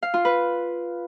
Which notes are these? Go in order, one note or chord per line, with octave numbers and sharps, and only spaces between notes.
F5
F4
B4